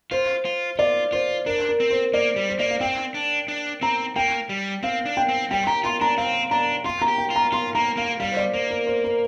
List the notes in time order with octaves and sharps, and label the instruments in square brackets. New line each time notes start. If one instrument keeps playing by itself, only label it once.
[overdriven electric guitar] F4 [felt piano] C5
[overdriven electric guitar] F4
[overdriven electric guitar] F4 [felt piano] D5
[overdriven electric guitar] F4 [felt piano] C5
[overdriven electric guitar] D4 [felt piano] A#4
[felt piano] A#4
[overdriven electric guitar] C4
[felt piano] C5
[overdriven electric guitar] A#3 [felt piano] D5
[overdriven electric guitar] G3
[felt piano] C5
[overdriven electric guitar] A#3 [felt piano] D5
[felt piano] F5
[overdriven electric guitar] C4 [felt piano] G5
[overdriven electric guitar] D4
D4
[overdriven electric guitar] C4 [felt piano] A#5
[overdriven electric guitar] A#3 [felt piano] G5
[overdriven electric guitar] G3
[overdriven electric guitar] C4 [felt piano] F5
[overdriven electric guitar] D4
[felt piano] G5
[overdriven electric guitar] C4
[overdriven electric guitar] G3 [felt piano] G5
[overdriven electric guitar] G4 [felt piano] A#5
[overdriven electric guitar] F4 [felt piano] C6
[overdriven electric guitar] D4 [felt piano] A#5
[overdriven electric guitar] C4 [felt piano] F5
[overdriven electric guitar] D4 [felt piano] A#5
[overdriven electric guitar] F4 [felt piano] C6
[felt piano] A#5
[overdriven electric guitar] G4
[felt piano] G5
[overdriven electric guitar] F4
[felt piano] A#5
[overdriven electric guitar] F4 [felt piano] C6
[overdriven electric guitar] A#3 [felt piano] A#5
[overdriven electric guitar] A#3 [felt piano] F5
[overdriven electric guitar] G3 [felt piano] F5
[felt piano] C5
D5
[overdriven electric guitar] A#3 [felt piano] C5
[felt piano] A#4
C5
A#4